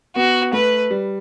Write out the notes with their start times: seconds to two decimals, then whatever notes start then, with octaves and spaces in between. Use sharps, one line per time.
0.16 B3 F#4
0.53 A3 B4
0.91 G3